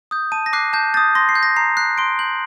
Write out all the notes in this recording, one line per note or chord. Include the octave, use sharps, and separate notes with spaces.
D#6 G6
A5 D#7
A#6
D6 F#6 C7
A5 G6
D#6 G6 A6
C6 A#6
C7
G6
A#6
A#5 C7
F#6 C7
C6 D7
G6 F#7